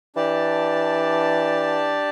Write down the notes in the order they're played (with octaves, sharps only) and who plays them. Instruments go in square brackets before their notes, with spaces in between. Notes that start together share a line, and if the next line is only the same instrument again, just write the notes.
[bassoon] E3 [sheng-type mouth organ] D4 G4 D5 A5